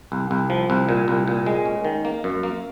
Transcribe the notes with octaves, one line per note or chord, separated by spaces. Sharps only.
C2
C2
F3
C2
A#2
C2
A#2
G#3
C#4
D#3
A#3
F#2
A#3